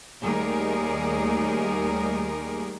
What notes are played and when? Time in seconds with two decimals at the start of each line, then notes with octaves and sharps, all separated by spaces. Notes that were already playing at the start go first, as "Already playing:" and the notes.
0.23 D#2 G3 A3 D#4 G#4 A#4